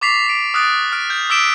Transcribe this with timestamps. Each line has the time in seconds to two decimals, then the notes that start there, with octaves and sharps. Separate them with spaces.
0.01 C#6 D6 A6 B6 C7 F7
0.26 D7 F7
0.54 D6 D#6 F6 F#6 A6 D7
0.92 F6 D7
1.10 G6
1.30 D6 E6 B6 D7 E7